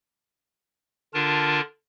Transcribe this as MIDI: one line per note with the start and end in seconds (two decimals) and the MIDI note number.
1.14 1.61 50
1.14 1.61 62
1.14 1.61 65
1.14 1.61 70
1.14 1.61 81